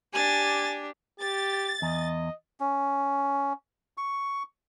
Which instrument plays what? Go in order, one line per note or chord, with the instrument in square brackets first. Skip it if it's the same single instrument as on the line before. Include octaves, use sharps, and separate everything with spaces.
[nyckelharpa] D4 G4 [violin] G#5 A6
[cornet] G4 [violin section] A6
[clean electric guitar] E2 [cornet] D#5
[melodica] C#4
C#6